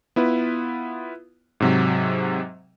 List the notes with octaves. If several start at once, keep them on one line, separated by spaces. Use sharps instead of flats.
B3 E4 F4 B4
G#2 C3 F#3